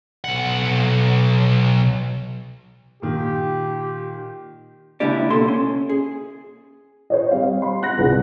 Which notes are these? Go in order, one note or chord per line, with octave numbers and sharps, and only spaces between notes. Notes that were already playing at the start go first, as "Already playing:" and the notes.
B1 F#5
A#2 D#3 G4
C#2 A#3 D4 E4 G4 D5
B2 A#3 A4 C6
C#4
G#4
C5 C#5 D#5
G3 C4 F5
B5 C6
F#5 F#6 A#6
G1 C2 G#4